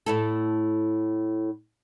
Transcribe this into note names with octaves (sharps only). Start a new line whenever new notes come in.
A2 E4 A4